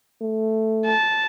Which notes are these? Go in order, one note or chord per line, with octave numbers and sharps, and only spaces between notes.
A3
A5